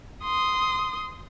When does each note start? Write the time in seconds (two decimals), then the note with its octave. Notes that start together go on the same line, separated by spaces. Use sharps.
0.24 C6 D#6